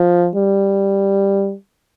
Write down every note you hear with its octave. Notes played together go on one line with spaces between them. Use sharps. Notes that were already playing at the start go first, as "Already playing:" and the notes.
Already playing: F3
G3